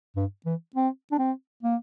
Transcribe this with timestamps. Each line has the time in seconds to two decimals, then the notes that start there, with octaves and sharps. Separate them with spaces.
0.16 G2
0.46 E3
0.76 C4
1.12 D4
1.19 C4
1.63 A#3